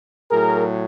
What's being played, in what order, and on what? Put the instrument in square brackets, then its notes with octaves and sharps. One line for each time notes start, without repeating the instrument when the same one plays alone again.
[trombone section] A2 F#3 G#4 A#4